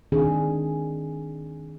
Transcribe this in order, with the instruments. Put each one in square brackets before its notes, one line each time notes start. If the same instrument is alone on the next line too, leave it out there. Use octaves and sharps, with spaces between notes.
[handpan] D#3 C4 D4 G#4